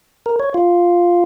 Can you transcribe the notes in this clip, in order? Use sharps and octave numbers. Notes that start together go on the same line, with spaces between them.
A#4
C#5
F4